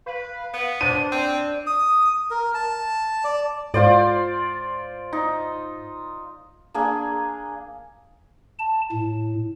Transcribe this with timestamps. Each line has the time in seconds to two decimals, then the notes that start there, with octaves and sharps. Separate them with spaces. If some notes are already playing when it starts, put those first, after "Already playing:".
0.06 B4 F5
0.54 B3 F#5
0.81 D4 C5 D#7
1.12 C4
1.67 D#6
2.31 A#4
2.54 A5
3.24 D5
3.74 G#2 F4 C5 D5
5.13 D#4
6.74 A#3 D4 G#4 G#5
8.59 A5
8.92 A2